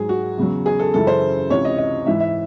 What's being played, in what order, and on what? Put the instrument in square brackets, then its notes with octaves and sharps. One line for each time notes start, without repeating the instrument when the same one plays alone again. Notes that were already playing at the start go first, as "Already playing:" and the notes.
Already playing: [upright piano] G#2 F#3 G#4
F#4
E2 C#3 F#3
G#4
A4
F#2 C#3 E3 A4
C5
C#2 C3 E3 C#5
D#5
D#5
G#2 E3 E5
E5